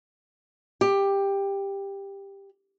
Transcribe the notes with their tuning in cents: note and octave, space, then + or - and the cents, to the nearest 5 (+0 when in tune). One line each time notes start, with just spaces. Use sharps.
G4 +10